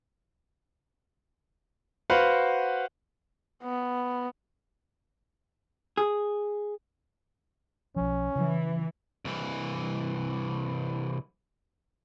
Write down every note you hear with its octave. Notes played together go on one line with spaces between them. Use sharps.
F#4 B4 C5 F5 F#5
B3
G#4
B1 F3 C#4
C#3 E3
C2 E3